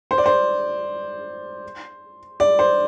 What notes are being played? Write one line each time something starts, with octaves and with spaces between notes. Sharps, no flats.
C5
D5
C5
D5
C5